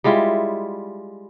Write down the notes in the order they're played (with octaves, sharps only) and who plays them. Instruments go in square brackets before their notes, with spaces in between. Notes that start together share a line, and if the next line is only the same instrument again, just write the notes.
[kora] G3 G#3 E4 F4